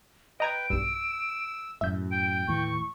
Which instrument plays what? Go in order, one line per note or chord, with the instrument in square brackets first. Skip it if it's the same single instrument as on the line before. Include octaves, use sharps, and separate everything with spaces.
[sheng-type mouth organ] B4 G5 [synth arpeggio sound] D#5 A#5 G#6 [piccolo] D7
[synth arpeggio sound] B1 G2 [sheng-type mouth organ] E6
[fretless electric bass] F#2 A2 [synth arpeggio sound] E5 G6
[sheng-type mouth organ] G5 [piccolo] D7
[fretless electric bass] D#2 A2 E3 [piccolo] C#6